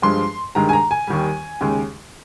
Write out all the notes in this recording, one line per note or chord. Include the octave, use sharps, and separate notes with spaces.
G2 F3 G#3 C6
G2 D#3 G#3 A#5
G#5
A#5
G#5
D#2 D#3 G3
D#2 C#3 G#3